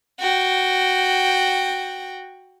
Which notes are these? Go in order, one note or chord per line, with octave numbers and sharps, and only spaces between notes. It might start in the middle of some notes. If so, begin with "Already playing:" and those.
F#4 G5